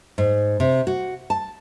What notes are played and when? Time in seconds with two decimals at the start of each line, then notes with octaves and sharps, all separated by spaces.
0.18 G#2
0.60 C3
0.87 F#4
1.30 A5